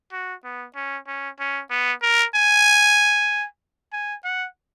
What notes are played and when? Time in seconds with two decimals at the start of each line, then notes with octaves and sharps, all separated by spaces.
0.12 F#4
0.44 B3
0.75 C#4
1.07 C#4
1.39 C#4
1.70 B3
2.02 A#4
2.35 G#5
3.93 G#5
4.24 F#5